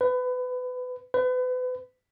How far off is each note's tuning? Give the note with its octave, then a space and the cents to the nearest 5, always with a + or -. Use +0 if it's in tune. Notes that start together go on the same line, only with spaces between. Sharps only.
B4 +25
B4 +35